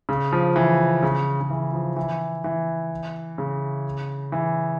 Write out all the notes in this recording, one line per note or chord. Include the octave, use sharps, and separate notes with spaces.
C#3
F3
E3
C#3
C#3
E3
F3
E3
E3
C#3
E3